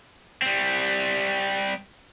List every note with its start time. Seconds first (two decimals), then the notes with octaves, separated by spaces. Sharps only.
0.42 G3 C4